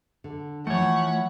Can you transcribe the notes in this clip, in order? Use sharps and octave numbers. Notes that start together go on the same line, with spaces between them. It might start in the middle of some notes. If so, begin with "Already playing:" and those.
D3
E3 F3 A3 C#5 F#5 B5